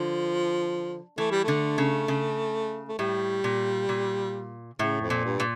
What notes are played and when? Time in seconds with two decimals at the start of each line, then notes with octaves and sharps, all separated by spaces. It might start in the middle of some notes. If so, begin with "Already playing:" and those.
Already playing: D3 F3
1.18 E3 A3
1.32 G3
1.44 D3 A3
1.78 C#3
2.08 C#3
2.89 A3
2.99 A2 G3
3.44 A#2
3.89 A#2
4.79 A2 C#3
5.01 F2
5.10 A#2
5.25 G2
5.40 A#2